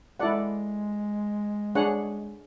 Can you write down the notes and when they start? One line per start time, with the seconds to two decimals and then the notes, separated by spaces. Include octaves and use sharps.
0.19 G#3 E4 A4 D5 F#5
1.75 D4 G#4 C#5 F#5